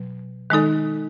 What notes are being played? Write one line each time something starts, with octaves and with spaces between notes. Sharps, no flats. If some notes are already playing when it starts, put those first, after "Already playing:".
Already playing: B2 F#3
D#3 G#3 D#4 A4